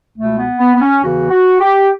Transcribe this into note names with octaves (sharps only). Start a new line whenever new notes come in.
C#2 B2 A3
B3
B3
B3
C#4
E2 C#3 E3 F#4
F#4
G4